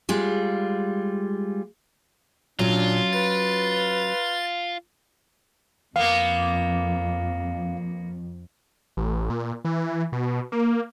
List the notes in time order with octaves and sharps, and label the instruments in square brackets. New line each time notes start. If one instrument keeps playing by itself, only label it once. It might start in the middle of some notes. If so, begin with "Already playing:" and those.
[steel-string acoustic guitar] G3 G#3 F4
[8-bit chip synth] A#2 [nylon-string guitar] F#3 C#4 [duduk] D4 [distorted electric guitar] F4
[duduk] B4 [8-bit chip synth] A6
[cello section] F2 [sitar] A#3 B3 [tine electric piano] F5
[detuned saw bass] A1
A#2
E3
B2
A#3